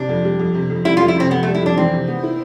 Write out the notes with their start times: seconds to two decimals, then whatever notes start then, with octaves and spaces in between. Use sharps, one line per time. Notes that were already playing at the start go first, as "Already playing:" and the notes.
Already playing: C3 D4
0.09 F2
0.24 G3
0.39 F2
0.54 C3
0.70 F2
0.85 G3 E4
0.97 F4
1.00 F2
1.08 E4
1.16 C3 C4
1.31 F2 B3
1.43 A3
1.47 G3
1.54 E4
1.62 F2 D4
1.77 E3 C4
1.93 C3
2.08 B3
2.23 E4